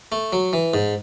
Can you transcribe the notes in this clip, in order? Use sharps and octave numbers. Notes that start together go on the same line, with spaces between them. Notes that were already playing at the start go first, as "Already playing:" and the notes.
A3
F#3
E3
G#2